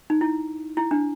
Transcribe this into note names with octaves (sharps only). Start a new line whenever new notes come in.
D#4
E4
E4
D4